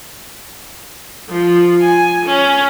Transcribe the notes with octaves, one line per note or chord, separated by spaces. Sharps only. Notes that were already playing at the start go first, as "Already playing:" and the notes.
F3
G#5
C#4